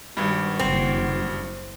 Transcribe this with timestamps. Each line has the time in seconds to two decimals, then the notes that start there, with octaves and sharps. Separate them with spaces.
0.17 G#1 G2 F#4
0.59 F#1 C4